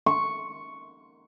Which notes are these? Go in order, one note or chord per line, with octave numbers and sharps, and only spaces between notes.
C#6